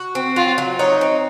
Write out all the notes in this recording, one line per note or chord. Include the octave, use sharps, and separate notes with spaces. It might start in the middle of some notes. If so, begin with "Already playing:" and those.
Already playing: F#4
C4
F#3 F4
F#3
D#4 C#5
C4